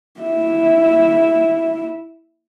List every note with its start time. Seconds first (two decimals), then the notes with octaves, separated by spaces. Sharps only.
0.21 E4 E5